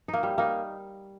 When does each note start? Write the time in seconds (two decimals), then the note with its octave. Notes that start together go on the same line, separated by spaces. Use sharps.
0.08 D#4
0.13 A#3
0.23 G3
0.38 A#3 D#4